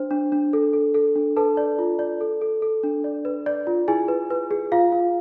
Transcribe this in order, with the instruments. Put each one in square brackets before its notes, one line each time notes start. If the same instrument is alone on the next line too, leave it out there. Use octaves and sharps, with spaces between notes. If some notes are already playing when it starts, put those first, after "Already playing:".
Already playing: [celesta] D4 C5
D4
D4
A4
A4
A4
D4
A4 B4 A5
D5
F4
D5
A4
A4
A4
D4
D5
B4
D5
F4
E4 G#4 G#5
B4
B4
G#4
F4 F5
F4